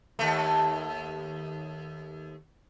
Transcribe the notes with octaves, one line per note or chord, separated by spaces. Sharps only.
D#2 A3